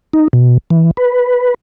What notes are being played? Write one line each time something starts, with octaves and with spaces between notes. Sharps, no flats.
D#4
B2
E3
B4